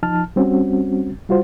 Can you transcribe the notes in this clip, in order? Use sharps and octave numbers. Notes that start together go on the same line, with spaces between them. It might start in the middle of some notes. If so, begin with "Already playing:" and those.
F3 D#4 A5 F6
G3 C4 C#4 F#4
G3 F4 F#4 C5